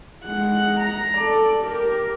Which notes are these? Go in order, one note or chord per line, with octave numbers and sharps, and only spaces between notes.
G#3 F#5
A#5
A4 D5
G4 A#4